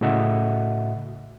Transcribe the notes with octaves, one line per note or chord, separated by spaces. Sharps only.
A2 C#3 F#4 D#5 E5 F#5